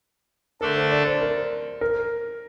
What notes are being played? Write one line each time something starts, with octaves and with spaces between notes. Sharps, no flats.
D3 A3 D4 A4 A#4
C5
D5
C5
A#4
A#4